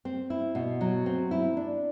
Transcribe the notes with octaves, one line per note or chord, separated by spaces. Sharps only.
C4
E4
B2
F#3
C4
E4
D4